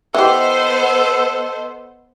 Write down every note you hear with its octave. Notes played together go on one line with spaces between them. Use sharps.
E3 B3 G4 A4 B4 C5 D#5 C6